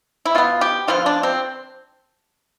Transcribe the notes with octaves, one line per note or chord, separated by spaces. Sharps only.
E4
B2 B3 F4
G4
D3 F3 B3 F4
D4
C4